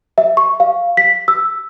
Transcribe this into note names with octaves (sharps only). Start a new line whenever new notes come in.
E5
C#6
F5
B6
E6